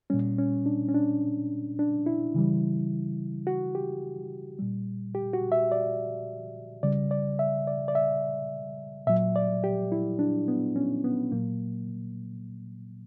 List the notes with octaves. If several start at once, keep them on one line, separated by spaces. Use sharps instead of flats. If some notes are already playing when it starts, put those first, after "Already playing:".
A#2 G3 C#4
C#4
D4
C#4
D4
D4
E4
C#3 E3 G3
F#4
G4
A#2 G3
G4
F#4
E5
D5
C#3 G3 D5
D5
E5
D5
D5
E5
A#2 F#3 E5
D5
G4
E4
D4
B3
C#4
B3
A#2 F#3 A#3